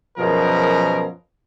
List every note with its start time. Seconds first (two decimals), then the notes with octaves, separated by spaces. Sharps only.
0.18 F#2 B2 F3 G#4 A#4